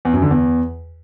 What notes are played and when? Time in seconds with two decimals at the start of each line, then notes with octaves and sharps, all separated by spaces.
0.05 E2
0.13 F#2
0.22 D3
0.31 E2